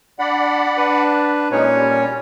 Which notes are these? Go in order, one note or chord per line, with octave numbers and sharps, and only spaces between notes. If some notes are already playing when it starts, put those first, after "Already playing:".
D4 D5 F#5 B5
D4 B4
A#2 E3 G#3 C#4 D#4 C#5
G3